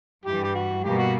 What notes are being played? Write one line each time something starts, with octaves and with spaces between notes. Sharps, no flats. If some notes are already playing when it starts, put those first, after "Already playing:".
G2 E3 G3 G4
G4
F#4
B2 G3 A#3 G4
F#4